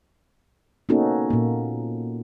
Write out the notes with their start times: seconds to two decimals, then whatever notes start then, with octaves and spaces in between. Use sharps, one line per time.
0.89 A#3 B3 C#4 D#4 F#4 A4
1.30 A#2 A#3